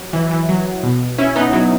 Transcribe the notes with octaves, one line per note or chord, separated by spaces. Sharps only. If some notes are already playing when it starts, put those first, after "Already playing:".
Already playing: F#3
E3
E3
F#3
B2
C#4 E4
B3 D#4
F#3